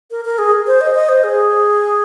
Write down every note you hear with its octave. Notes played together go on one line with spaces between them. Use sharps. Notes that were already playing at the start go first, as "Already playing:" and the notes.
A#4
A#4
G#4
C5
D#5
D#5
C5
G#4